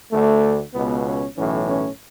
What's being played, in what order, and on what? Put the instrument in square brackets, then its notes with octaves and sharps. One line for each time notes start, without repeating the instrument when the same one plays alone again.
[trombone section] D2 D3 A3
C#2 B2 B3
C#4
B1 A2 E3 C#4
C#4